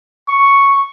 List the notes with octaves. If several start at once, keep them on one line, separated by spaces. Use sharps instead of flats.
C#6